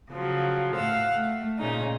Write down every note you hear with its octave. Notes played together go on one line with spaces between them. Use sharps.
C#3 F3 F#3
A2 F5 F#5 E6
A3
A#2 C#3 C#4 D#4